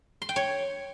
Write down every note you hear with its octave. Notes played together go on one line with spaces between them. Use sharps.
C6
G5
C#5